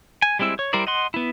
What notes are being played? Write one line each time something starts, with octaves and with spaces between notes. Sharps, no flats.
G#5
G3 G#3 C4 E4 E6
C#5
G3 E4 A#4 C5 D5
D#5 F#5 C6
B3 E4